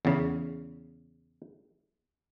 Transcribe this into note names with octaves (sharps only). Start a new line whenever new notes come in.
E2 C#3